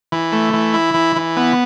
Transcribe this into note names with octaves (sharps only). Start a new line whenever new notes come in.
E3
A3
E3
E4
E3
E3
B3